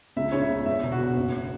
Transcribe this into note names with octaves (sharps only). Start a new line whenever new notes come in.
C#2 E5
C#3 C#5
E5
C#2
E2 E5
E1
F#4
E1
F#1